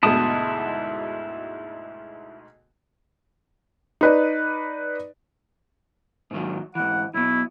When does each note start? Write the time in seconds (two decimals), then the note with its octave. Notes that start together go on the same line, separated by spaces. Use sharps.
0.03 D2 G#2 B2 E4 A5 D#6
4.01 D#4 B4 D5
6.31 G#2 D#3 F#3
6.75 G#2 E3 F#5
7.14 B1 B2 E4